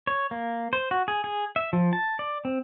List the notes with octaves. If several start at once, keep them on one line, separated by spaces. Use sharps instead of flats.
C#5
A#3
C5
F#4
G#4
G#4
E5
F3
A5
D5
C4